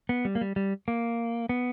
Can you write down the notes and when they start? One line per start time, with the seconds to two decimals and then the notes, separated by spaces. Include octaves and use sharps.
0.09 B3
0.25 G3
0.35 A#3
0.41 G3
0.56 G3
0.88 A#3
1.49 B3